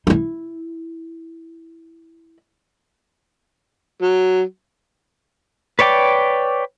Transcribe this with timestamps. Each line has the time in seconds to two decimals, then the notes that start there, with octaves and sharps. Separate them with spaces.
0.07 D#4 E4
4.02 F#3
5.79 B4 C#5 D5 G5 D6